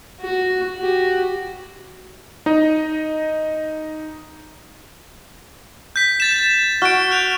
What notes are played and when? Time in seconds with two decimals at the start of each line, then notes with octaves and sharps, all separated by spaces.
0.21 F#4
0.77 F#4 G4
2.46 D#4 D#5
5.96 G6 B6
6.20 A6 E7
6.82 F#4 F6 D7
7.11 F#6 G6 F7